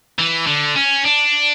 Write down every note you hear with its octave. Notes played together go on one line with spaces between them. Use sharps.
E3
D3
C#4
D4